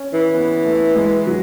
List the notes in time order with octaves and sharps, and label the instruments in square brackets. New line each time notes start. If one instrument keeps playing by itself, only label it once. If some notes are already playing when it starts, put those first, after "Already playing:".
Already playing: [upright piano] C#4
[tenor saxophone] E3
[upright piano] B3
A3
G#3
F#3